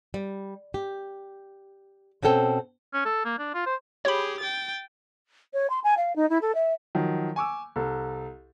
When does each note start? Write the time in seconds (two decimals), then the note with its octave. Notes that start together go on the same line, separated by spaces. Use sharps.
0.14 G3
0.74 G4
2.22 B2 C4 C#4 A4 G5
2.94 C#4
3.05 A4
3.24 A#3
3.39 D4
3.54 F4
3.66 C5
4.05 G4 G#4 C#5 B5
4.40 G5 A6
5.53 C#5
5.70 C6
5.84 G#5
5.97 F5
6.16 D#4
6.30 E4
6.42 A4
6.55 E5
6.95 D#3 F3 F#3
7.36 G#5 C#6 D6 E6
7.76 C2 A4